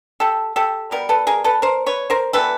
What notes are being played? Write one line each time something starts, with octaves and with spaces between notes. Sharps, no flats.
G4 A4
G4 A4
B2 G3 B3 A#4
A4 B4
G#4 A#4
A4 B4
A#4 C5
B4 C#5
A#4 C5
E3 G3 B3 A4 B4